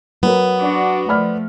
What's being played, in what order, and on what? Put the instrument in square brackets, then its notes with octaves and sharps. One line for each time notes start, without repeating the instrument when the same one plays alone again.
[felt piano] F#3 A#4 B4 [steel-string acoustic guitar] B3
[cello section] D4 F#4
[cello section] F3 A3 [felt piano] D5 B5 F6